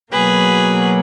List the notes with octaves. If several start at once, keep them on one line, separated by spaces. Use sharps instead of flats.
B2 F#3 A#3 G#4 B4